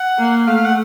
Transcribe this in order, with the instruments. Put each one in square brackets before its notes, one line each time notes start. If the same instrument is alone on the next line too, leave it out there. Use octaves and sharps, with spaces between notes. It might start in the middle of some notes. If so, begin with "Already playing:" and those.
Already playing: [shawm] F#5
[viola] A#3
[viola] A3 [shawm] F5
[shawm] F5
F#5